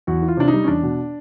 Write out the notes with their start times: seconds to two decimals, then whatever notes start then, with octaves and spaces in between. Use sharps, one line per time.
0.07 E2 F#4
0.22 E3
0.28 F4
0.37 C3 D4
0.48 D#4
0.53 G3
0.64 C#4
0.68 E2 D4
0.83 B2